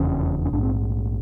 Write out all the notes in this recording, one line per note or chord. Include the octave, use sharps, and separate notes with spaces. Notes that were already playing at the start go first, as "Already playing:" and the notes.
Already playing: F1 E2 C#3 C#4
C#4
A#1 G#2 D4
C4